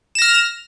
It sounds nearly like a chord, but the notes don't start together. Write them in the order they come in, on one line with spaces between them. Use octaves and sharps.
E7 A#6 F6